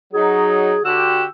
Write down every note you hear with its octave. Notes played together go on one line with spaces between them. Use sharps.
F#3 D#4 G#4
D3 F#4 G4 E6